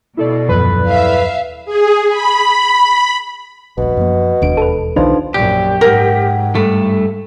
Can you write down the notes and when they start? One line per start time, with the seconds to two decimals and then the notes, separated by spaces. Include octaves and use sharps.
0.17 B2 E4 A4 D5
0.49 D#1 F#2 F3 B4
0.88 E5 F5
1.65 G#4
2.09 B5
3.78 D#1 A#1 B2
3.97 F#2 F3 A#3
4.42 E1 D#2 D4 D7
4.57 A4 B4
4.96 B1 D#3 F3 D4 D#4 B4
5.34 A#1 F#2 G4 D5
5.81 G#2 A#4 F#5 G5
6.55 G2 A3 A4